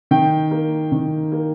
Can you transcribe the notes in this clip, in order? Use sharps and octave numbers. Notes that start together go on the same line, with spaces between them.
D#3 G5
A#3
D#3
A#3